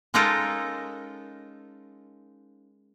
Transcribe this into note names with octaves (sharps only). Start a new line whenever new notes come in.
G#3 C#4 D#4 F4 A4 A#4